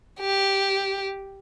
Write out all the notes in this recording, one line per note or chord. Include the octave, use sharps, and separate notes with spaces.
G4